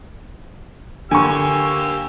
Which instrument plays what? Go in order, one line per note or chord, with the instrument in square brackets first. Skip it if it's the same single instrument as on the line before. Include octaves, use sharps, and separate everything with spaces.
[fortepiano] D3 [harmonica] A#3 G4 E6 [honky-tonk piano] G#5 C#6